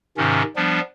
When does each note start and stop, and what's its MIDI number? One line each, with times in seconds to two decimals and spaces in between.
0.17 0.43 44
0.17 0.43 48
0.17 0.43 51
0.17 0.43 61
0.56 0.80 53
0.56 0.80 55
0.56 0.80 59
0.56 0.80 62